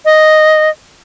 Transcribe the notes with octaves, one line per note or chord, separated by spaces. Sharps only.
D#5